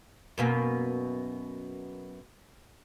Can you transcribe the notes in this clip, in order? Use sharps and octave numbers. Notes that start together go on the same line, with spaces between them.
F#2 B2 A#3